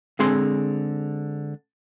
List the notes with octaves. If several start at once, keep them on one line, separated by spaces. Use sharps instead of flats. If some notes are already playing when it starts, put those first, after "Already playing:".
D3 G#3 C4 G#4 C6